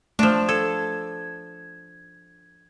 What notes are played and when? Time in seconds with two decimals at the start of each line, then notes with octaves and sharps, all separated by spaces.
0.19 F3 A3 D4 E7
0.49 A4 G#6